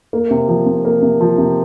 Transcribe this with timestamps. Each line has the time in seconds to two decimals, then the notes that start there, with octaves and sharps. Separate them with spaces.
0.13 A#3
0.31 C3
0.48 F3
0.66 C3
0.85 A#3
1.02 C3
1.21 F3
1.38 C3